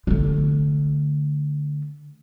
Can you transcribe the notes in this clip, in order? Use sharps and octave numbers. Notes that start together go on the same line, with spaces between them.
D3 A3